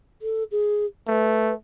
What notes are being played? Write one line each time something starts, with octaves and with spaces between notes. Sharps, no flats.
A4
G#4
A3 B4